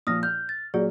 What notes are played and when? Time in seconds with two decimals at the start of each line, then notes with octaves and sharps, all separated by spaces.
0.07 A#2 F3 D#6 F6 A#6
0.23 F6 G6
0.49 A6
0.74 A#2 F#3 G#4 D5